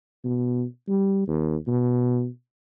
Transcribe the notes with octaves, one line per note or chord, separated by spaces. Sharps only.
B2
G3
D#2
B2